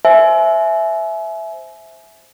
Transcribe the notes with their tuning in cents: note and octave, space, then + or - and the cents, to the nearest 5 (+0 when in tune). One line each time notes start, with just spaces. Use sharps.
C5 +0 E5 +0 G#5 +35